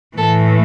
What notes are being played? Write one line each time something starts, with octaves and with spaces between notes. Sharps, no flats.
A2 E3 A3 A4